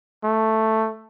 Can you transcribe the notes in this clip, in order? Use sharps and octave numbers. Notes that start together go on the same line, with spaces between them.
A3